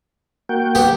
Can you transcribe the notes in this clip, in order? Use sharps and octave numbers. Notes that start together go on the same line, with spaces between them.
A#3 F#4 G5
B3 G4